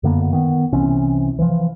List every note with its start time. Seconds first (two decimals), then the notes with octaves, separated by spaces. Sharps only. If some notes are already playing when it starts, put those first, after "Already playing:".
0.03 F#2 D3 A#3 B3
0.33 D#3 B3
0.73 C2 C3 E3 C#4
1.39 E3 F3